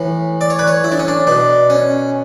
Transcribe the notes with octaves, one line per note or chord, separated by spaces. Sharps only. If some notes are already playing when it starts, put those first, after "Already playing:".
Already playing: A2 E3
D5
C#5
B4
C#5
E4
D4
C#4
D4
B2 D4
C#4